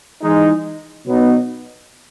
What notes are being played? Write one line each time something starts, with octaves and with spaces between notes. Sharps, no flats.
E3 G#3 D#4
B2 F#3 B3 D#4